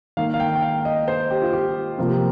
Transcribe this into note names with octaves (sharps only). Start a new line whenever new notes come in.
D#3 A#3 F5
F5
G5
G5
F5
D#5
C5
G4
F4
G4
C3 F3 A#3 F4
G4